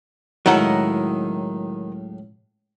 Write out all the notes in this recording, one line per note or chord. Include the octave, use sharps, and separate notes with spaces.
C#2 A2 D#3 F#3 D#4 E4 F5 F#5